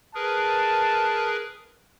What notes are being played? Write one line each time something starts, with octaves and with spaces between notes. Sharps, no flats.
G#4 A#4 B4 A5